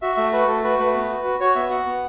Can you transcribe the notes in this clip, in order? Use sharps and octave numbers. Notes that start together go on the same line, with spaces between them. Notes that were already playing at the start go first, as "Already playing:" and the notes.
F#4 E5
A3 E5
F#4 B4
A3 A4
F#4 B4
A3 B4
B3 B4
F#4
F#4
F#4 C#5
B3 E5
F#4 F#5
B3